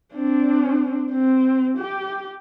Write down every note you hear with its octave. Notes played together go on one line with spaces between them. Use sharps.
C4 D4
C4
G4